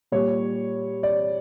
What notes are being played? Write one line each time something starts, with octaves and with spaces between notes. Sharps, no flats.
A#2 G3 C#5
D5